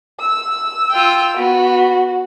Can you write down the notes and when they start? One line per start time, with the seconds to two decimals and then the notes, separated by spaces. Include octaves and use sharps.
0.20 E6
0.90 F4 G5
1.37 B3 F#4